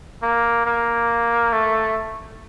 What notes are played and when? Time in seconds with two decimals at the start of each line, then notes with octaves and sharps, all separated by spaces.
0.23 A#3
0.66 A#3
1.53 A3